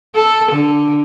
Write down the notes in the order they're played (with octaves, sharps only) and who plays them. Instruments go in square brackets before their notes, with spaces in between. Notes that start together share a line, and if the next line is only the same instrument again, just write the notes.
[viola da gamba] A4
D3